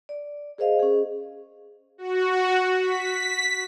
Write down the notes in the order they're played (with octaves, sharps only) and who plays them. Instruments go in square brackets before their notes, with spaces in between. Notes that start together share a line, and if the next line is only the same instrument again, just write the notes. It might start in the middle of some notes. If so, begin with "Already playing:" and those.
[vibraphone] D5
G#4 A#4 C5 D#5 F5
C#4 G#4
[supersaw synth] F#4
B6